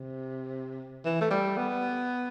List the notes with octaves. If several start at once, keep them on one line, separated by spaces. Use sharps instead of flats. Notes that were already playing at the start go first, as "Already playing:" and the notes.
Already playing: C3
E3
A3
G3
B3